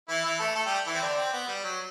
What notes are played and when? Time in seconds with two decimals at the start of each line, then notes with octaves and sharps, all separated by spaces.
0.08 E3 E4
0.24 E3 E4
0.39 A3 A4
0.55 A3 A4
0.66 G3 G4
0.86 E3 E4
0.94 C4
1.02 D3 D4
1.17 C4
1.33 B3
1.48 G3
1.64 F#3